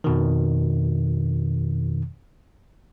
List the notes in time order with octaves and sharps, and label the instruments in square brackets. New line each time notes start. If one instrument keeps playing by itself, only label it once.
[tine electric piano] F2 B2 D#3